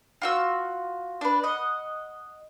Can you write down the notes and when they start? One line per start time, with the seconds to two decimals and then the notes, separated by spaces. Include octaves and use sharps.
0.22 F4 F#4 E6
1.21 D4 B4
1.44 D#5 F#5